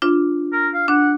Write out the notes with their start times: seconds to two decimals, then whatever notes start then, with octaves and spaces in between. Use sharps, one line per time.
0.02 D4 F4
0.53 A#4
0.74 F5
0.88 D4 F#5